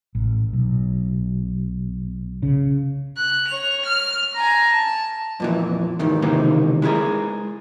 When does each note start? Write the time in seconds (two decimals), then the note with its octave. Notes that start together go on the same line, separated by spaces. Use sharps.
0.15 A1
0.53 B1
2.43 C#3
3.17 F#6
3.48 C#5 F7
3.86 F6
4.35 G#5 A#5
4.71 A5
5.40 F2 A#2 E3
5.99 D#2 G#2 D#3 E3
6.22 C#2 C3 D#3 E3 A#3
6.82 G#3 E4 G4 G#4 A#4